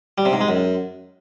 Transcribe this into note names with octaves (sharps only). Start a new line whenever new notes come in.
G3
C3
G#2
G#3
F#2